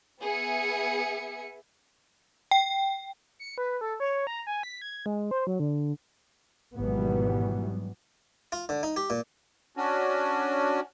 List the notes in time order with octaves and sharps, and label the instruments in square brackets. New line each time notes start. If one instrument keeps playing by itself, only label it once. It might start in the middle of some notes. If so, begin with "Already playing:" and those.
[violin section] B3 G#4 E5 C#7
[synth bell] G5
[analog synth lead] C#7
B4
A4
C#5
A#5
G#5
B6
G#6
G#3
C5
F#3
D3
[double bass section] G#1 B2 E3 F#3 G3 B3
[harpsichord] F4
D3
D#4
G4
A#2
[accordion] C#4 D4 F#4